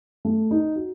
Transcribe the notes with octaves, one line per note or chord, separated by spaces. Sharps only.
A3
D#4
F#4